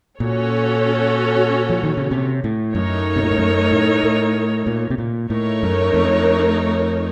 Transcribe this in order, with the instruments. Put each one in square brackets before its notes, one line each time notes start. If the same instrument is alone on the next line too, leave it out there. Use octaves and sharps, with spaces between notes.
[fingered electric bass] A#2 [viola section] C#4 F#4 A4 C#5
[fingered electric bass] F3
D#3
C#3
C3
A2
[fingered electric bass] F#2 [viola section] A3 D#4 A#4 C#5
[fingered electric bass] C3
A#2
A2
F#2
A2
A2
A#2
C3
A#2
[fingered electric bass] A2 [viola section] A3 D#4 A#4 C#5
[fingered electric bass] F#2
F2